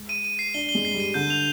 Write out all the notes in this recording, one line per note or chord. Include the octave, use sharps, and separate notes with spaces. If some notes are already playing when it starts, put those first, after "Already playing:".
Already playing: G#3
D#7
D#7
C7
D4 G7
G7
G#3
C7
G3
D#7
D3 G6
F7